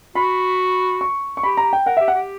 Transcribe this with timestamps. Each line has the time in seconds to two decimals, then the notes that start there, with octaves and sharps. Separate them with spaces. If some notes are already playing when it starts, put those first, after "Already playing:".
0.15 F#4 B5
1.01 C#6
1.37 C#6
1.43 G4 B5
1.57 A#5
1.73 G5
1.86 A#4 F#5
1.97 G4 E5
2.08 F#5
2.15 G4